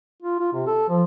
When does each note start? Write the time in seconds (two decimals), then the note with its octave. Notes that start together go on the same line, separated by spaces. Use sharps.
0.22 F4
0.40 F4
0.53 C3
0.67 A4
0.89 F3